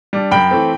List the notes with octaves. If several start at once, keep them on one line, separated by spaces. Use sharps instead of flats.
G3 D4
F#2 G5 B5
E3 A3 C4